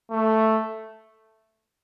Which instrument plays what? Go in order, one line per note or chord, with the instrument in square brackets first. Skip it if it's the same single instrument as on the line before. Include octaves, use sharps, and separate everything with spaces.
[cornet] A3